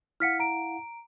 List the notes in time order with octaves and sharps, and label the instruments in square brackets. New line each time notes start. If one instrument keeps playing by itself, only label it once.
[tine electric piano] E4 F5 F#5 [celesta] F6 B6 C#7
[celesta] A#5 D7